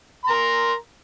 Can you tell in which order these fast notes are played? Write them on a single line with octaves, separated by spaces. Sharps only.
C6 A#5 A#4